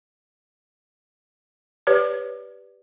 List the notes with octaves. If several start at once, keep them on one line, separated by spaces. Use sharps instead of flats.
G4 B4 C#5 D5